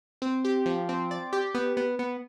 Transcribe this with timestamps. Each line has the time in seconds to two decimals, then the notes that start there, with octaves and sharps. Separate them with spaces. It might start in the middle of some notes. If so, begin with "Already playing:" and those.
0.22 C4
0.45 G4
0.66 F3
0.89 C4
1.11 D5
1.33 G4
1.55 B3
1.77 B3
1.99 B3